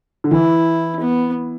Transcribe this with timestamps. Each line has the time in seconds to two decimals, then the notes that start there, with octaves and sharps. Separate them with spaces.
0.24 D3
0.31 E3 E4
1.01 B3